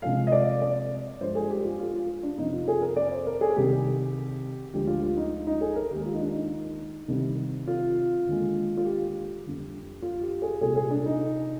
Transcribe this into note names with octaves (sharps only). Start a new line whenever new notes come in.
C2 C3 F3 G#3 F5
D#5
D5
D5
G2 F3 G#3 C5
G#4
G4
F4
F4
F4
D4
F2 C3 F3 D#4
F4
G#4
A#4
D5
C5
A#4
G#4
C2 C3 D#3 G3 G4
D2 D3 F3 G#3 G4
F4
F4
D#4
D#4
G#4
A#4
D#2 D#3 G#3 G4
G4
F4
D#4
D4
D#4
C2 C3 D#3 G3
F4
D#2 D3 G#3
F4
G4
F2 D3 G3
F4
G4
G#4
C2 A#2 G3 G#4
G#4
D4
D#4